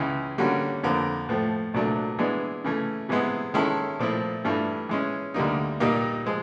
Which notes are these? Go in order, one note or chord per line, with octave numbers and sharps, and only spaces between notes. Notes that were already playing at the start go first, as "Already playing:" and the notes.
Already playing: C#2 C#3 E3 G#3
D3 G3 A#3 C#4 F#4
F2 D3 F3 A#3
A2 F3 A3
C2 A#2 F#3 A3 D4
E3 G#3 B3 D4
C#3 E3 A3
C3 E3 G#3 B3
D#3 G#3 C#4 E4 A4
A#2 F3 A3 C4 E4
G2 E3 A3 D4 F4
E3 G#3 C#4
D2 D3 G3 A#3 D#4
A#2 G3 A#3 D#4 G4
F3 G#3